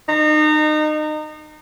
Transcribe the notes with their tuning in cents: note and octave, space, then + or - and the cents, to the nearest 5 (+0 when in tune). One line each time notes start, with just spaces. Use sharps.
D#4 -30